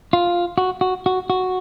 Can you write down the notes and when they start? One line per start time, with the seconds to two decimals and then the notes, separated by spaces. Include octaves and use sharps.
0.13 F4
0.58 F#4
0.81 F#4
1.06 F#4
1.30 F#4